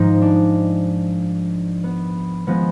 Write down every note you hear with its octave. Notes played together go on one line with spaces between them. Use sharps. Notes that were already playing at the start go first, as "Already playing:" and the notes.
Already playing: G#2 F3 G#3 D#4
D4
B3
F3 G#3 B3